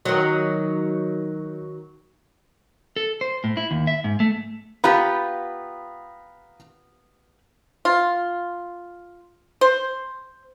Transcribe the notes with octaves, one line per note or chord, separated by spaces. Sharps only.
D#3 F#3
A4
C5
A2
E4
D#2
E5
G#2
A3
B3 F4 G4 F5 A#5 B5
F4
C5